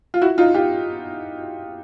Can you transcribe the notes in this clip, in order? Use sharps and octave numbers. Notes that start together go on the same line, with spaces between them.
F4
E4 F#4
D#4 F4
F4 G4